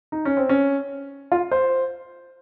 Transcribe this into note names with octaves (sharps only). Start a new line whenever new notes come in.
D#4
C#4
C4
C#4
F4
C5